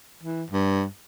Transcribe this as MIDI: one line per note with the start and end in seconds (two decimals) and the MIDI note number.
0.23 0.44 52
0.51 0.85 43